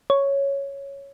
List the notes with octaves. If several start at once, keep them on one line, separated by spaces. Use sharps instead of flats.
C#5